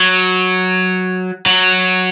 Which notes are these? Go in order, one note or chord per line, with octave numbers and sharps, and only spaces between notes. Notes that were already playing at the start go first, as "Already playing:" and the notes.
Already playing: F#3
F#3